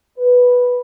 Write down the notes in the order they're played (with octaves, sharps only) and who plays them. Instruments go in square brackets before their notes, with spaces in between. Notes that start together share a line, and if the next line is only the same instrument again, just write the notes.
[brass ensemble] B4